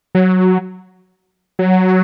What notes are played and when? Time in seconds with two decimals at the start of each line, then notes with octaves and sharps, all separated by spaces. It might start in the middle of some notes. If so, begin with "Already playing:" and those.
0.15 F#3
1.59 F#3